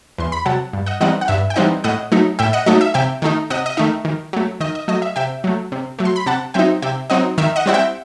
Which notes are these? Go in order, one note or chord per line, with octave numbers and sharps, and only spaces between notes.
E2 C6
B5
C3 F#3 F#5 A5
G2
D#5 F#5
E3 G3 C4 D#4 D#5 F#5
F#5
G2 E5
G5
E3 G3 C4 D#4 D#5 F#5
A2 D#5 F#5
F#3 A3 D#4
A2 E5 G5
D#5 F#5
F#3 A3 D#4 D#5
E5
C3 E5 G5
D#3 A3 D#4
C3 D#5 F#5
D#5
D#3 A3 D#4 E5
D#3
F#3 A3
D#3 D#5
D#5
F#3 A3 D#5
E5
C3 E5 G5
F#3 A3
C3
F#3 A3
C6
B5
C3 F#5 A5
F#3 C4 D#4 E5 G5
C3 E5 G5
F#3 C4 D#4 D#5 F#5
D#3 E5
D#5 F#5
G3 C4 E4 F#5
E5 G5